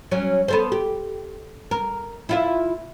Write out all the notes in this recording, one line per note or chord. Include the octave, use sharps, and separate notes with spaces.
F#3 C#4
B3 A4 C5
G4
A#4
E4 F4 E5